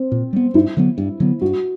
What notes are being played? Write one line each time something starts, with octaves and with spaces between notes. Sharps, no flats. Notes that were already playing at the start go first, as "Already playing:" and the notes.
Already playing: C4
A#2
G3 B3
G2 E4
D3 F#3 B3
G2
D3 F#3 B3
G2 F#4